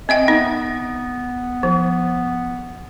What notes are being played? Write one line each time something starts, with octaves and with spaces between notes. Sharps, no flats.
C4 D#5 E5 G5
B3 D#4
F3